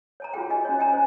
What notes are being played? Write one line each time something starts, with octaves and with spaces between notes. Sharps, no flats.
C#5 A5 A#5
F4 F#4 G#4 G5
F4 F#4 D#5 G#5
C#4 F#4 C#5
D#5 G5 G#5 A#5
C#4 C5 A#5